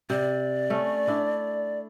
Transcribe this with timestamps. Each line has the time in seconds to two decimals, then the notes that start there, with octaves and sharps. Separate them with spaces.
0.10 C3 D5
0.70 A3 C#4
1.08 D4 E4